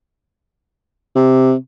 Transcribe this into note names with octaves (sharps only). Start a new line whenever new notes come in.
C3